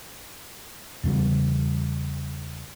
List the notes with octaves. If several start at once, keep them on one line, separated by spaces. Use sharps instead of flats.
E2 C#3 G3